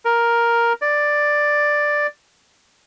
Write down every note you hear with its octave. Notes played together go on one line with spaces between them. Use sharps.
A#4
D5